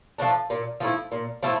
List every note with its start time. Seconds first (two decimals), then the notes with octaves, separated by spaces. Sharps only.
0.18 F3 A3 D4
0.50 A#2
0.80 F3 A3 E4
1.12 A#2
1.43 F3 A3 E4